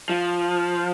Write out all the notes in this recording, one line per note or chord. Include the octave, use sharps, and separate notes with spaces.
F3